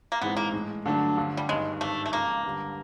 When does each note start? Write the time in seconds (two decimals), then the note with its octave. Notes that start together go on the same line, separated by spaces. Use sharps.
0.12 A#3
0.21 A#1 G#2 E3 G#3 B3 C4
0.37 A#3
0.52 A2 E3 G#3
0.85 G2 D3 F#3 A3 D4
1.17 G2 D3 F3
1.37 G3
1.48 G1 G2 D#3 G#3
1.81 G#1 G2 D#3 A3
2.06 A3
2.12 C#2 C#3 F3 G#3 A#3
2.45 G2 D3 G3